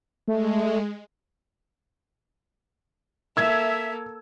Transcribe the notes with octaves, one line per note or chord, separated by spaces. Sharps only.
G#3 A3
A#3 A4 E5 E6 G#6